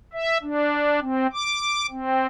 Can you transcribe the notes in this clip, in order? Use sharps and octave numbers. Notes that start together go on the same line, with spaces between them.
E5
D4
C4
D6
C4